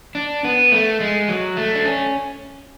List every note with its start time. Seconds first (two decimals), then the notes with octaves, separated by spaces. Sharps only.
0.15 D4
0.45 B3
0.72 A3
1.00 G#3
1.29 F#3
1.57 A3
1.75 D4
1.85 C#4